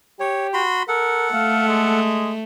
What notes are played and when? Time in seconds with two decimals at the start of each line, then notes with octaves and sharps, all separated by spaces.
0.20 G4 C#5
0.54 F#4 B5 C6
0.88 A4 A#4 F#5
1.34 A3 F5
1.67 G#3